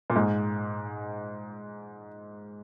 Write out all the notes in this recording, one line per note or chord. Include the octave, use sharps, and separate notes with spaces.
A#2
G#2